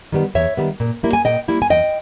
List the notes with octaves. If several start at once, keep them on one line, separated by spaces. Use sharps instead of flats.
D#3 G3 B3
E2 C#5 E5
D#3 G3 B3
A#2
G3 A#3 E4
G#5
A#2 D#5 G5
G3 A#3 E4
G#5
E2 D#5 G5